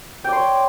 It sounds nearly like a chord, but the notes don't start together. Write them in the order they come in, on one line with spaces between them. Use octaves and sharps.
G5 D5 C6 C#5